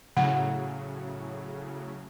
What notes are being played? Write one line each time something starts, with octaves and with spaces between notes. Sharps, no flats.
A2 C#3 F#3 F#5